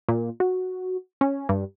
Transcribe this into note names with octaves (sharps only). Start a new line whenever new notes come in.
A#2
F#4
C#4
G2